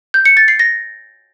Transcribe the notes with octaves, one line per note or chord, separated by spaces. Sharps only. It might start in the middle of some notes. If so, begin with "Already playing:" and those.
G6
C#7
A6
C7
A#6